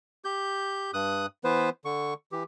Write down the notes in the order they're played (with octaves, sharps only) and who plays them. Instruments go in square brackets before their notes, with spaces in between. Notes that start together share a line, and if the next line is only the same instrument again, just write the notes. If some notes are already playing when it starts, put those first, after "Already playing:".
[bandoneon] G4 G6
G2 D#6 F#6
E3 B3 B4 C5
D3 C#6
E3 G4